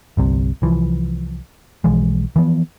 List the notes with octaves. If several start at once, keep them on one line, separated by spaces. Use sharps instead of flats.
G1 C2 C3
C2 E3 F3
B1 E3 F3 G#3
E3 F3 B3